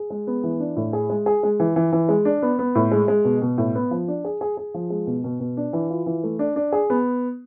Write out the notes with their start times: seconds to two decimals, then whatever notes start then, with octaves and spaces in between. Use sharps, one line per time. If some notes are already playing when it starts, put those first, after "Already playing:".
Already playing: G#4
0.10 G#3
0.27 B3
0.44 E3
0.60 D4
0.76 A2
0.93 G#4
1.10 G#3
1.26 G#4
1.43 G#3
1.60 E3
1.76 E3
1.92 E3
2.09 G#3
2.25 D4
2.42 B3
2.59 B3
2.75 A2
2.91 G#3
3.08 G#3
3.25 B2
3.42 B2
3.58 A2
3.75 B3
3.91 F3
4.08 D4
4.25 G#4
4.41 G#4
4.57 G#4
4.74 F3
4.90 G#3
5.07 B2
5.24 B2
5.40 B2
5.57 D4
5.73 E3
5.90 F4
6.06 E3
6.24 A3
6.39 D4
6.56 D4
6.72 G#4
6.90 B3